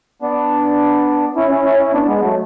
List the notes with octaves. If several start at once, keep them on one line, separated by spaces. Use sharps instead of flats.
B3 D4
C#4 E4
C#4 E4
C#4 E4
C#4 E4
B3 D4
G#3 B3
F#3 A3